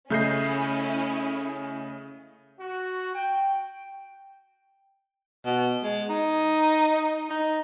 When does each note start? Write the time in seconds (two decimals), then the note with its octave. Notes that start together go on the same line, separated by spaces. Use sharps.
0.10 C#3 A3 C#4 E4 D#5 G6 C7
2.60 F#4
3.15 G5
5.46 B2
5.83 G#3
6.09 D#4
7.30 D#4